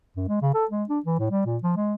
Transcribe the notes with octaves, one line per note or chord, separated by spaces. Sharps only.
F#2
G#3
C#3
A4
G#3
D4
E3
A2
G3
A#2
F3
G#3